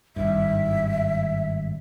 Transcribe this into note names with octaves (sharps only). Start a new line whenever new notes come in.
G#1 G2 E5